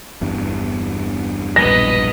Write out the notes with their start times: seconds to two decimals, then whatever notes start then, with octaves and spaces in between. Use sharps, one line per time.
0.21 G1 E2 G2
1.56 E1 A#1 G2 B3 D#5 A#6